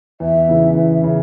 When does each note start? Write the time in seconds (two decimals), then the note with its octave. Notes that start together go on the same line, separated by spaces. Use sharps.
0.20 E2 E5
0.49 C#3 E3
0.77 E2
1.04 C#3